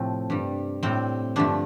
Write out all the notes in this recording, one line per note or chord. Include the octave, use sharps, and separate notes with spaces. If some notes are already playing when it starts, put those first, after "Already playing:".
Already playing: A2 C3 F3 A3 C4
G2 G3
A2 G3 C4
G2 D3 F3 A3 D4